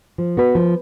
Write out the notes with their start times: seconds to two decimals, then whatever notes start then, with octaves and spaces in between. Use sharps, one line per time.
0.18 F3
0.37 B3 F#4 B4
0.55 F3